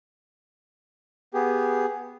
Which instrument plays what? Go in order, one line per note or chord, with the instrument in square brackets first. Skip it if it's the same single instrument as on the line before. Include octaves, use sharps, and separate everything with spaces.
[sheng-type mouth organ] B3 G4 G#4